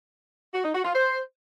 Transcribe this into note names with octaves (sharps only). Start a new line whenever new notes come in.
F#4
D#4
F#4
F4
C5